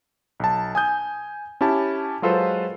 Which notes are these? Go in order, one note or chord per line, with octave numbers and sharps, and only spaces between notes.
B1 A5
G#5 D#6 G6
C#4 E4 G4 A5
F#3 G#3 F4 A4 B4 C5